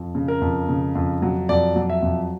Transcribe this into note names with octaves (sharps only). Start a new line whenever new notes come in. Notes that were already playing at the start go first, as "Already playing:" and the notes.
Already playing: F2
C#3
A#4
F2
C#3
F2
F#3
F2 D5
F#3
E5
F2